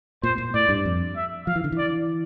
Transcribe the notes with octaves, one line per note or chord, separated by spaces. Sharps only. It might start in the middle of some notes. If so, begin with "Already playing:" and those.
A#2 C5
A#2
A2 D5
G2
F2
E5
F3 F5
E3
D3
E3
D5